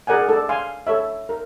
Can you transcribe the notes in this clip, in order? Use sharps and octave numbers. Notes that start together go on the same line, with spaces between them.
G#4 A#4 D5 F#5 G#5
A4 D5
F5 G#5 C6
A4 C#5 E5
A#4